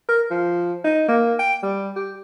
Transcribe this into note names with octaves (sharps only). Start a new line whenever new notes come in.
A#4
F3
D#4
A#3
G5
G3
G4